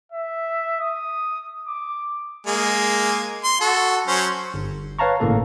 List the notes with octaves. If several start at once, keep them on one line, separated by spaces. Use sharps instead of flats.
E5
D#6
D6
G#3 A#3 G#5
C6
F#4 A4
F#3 C#4 C5
G1
B4 C#5 F5 A5 A#5 C#6
G#1 A2 C#3 A#3 A4